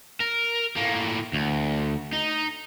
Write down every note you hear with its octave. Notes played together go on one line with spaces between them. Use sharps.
A#4
A2 A#3
D2
D#4